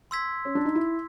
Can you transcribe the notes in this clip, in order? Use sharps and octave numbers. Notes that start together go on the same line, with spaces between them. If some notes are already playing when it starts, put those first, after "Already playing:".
C6 E6 G#6 B6
C#4
D4
D#4
E4